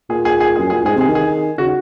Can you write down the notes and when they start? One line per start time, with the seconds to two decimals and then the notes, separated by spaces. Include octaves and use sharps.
0.10 A#2 G#4
0.25 G#4
0.40 G#4
0.56 G#4
0.59 F#2
0.70 A#2 G#4
0.84 G#2 G#4
0.96 C3 G#4
1.08 D#3
1.15 G#4
1.58 C#3 F#4